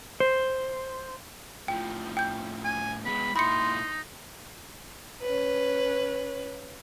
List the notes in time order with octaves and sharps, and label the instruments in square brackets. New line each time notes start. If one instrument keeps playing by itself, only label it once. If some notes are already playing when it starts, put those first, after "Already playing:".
[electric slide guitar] C5
[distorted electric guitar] A2 F3 [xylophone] G5
[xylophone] G5 G6
[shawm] G#5
[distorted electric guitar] G#3 B3 [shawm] B5
[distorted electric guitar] A#2 E4 [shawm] D#4 [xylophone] B5 C#7 [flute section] C6
[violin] C#4 B4